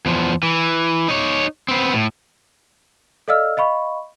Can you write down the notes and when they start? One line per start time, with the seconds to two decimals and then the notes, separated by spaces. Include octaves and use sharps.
0.06 E2 F3
0.43 E3
1.08 D#4 C#5
1.68 B3 C4
1.93 A2
3.28 A4 D5 D#5 F5 E6 F6
3.57 D#5 F5 B5 C#6